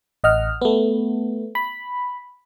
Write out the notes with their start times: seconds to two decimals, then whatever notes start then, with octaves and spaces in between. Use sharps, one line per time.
0.24 A1 D#5 F#5 F6
0.62 A3 B3
1.55 B5